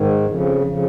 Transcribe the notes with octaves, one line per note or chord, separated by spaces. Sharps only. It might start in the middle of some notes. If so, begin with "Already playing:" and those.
Already playing: G#2 D#3
F2 C#3
F2 C#3